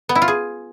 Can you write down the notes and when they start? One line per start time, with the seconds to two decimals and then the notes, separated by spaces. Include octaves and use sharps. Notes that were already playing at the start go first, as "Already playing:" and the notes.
0.09 B3
0.15 E4
0.22 F4
0.28 G#4